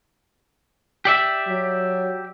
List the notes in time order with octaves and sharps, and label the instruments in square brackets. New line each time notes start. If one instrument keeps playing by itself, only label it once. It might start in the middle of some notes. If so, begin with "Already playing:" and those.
[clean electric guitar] G4 D5 E5
[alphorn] F#3